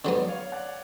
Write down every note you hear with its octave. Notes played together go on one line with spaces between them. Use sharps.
D3 F#3 B3 D5
C#5 F5
D5 F#5